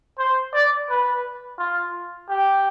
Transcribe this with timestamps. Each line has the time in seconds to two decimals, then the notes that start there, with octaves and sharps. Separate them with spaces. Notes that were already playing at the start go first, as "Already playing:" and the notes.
0.19 C5
0.54 D5
0.90 B4
1.59 F4
2.29 G4